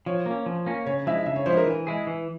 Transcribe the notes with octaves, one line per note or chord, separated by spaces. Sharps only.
F3 C#5
A#3 C#4
F3
A#3 C#4
C#3 C#5
F3 G#3 E4 E5
C#3 E5
C#5
F3 G#3 E4 C5
A#4
E3
G#3 E4 G#4
E3